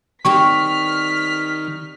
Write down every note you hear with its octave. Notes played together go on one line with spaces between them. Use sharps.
D#3 G3 C4 G4 C#6 F6 B6